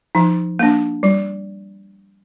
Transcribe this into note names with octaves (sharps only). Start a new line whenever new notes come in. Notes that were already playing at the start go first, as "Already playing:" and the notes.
F3 D#4
A#3 D4
G3